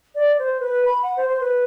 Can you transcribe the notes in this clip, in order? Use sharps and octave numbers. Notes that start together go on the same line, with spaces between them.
D5
C5
B4
B5
F#5
C5
C5
B4